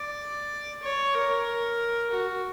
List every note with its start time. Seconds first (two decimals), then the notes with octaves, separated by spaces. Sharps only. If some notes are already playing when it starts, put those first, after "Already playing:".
Already playing: D5
0.83 C#5
1.15 A#4
2.11 F#4